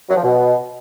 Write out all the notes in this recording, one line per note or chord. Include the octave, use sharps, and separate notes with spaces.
F#3
F3
B2